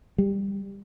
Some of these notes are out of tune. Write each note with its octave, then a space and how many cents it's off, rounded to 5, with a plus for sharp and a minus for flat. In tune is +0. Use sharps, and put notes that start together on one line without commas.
G3 +15